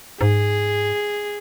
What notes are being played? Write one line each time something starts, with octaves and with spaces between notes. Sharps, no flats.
G#2 G#4